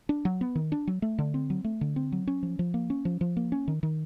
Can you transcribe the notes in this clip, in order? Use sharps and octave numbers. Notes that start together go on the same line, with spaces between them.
D4
F#3
B3
D#3
D4
F#3
A3
D3
C4
F#3
A3
D3
C4
F#3
C#4
F3
F3
A#3
C#4
F3
F3
A#3
C#4
D#3
D#3